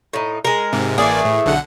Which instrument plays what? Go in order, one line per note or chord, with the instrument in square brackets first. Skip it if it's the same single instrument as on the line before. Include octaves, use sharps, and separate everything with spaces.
[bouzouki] A2 D#4
G#3 A#4
[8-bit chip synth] G#2 C3
[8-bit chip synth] A1 A#3 D5 [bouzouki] E3 A3 G#4
[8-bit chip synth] A2
B1 D3 F#5